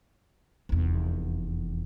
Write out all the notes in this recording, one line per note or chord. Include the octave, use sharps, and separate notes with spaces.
F1 E2